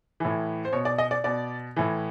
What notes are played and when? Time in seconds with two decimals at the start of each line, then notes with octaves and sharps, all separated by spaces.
0.20 A2 E3
0.65 C5
0.73 B2 C#5
0.85 D5
0.98 D#5
1.11 D5
1.24 B2 D5
1.76 A2 E3